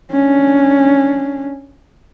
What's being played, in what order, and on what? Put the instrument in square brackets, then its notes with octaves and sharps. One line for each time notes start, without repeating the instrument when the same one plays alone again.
[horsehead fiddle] C#4 D4